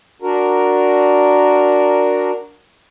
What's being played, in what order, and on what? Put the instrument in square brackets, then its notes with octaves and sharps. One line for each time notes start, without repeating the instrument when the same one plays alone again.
[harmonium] D4 F#4 A#4